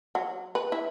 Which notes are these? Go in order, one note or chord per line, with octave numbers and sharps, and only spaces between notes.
F#3
B4
E4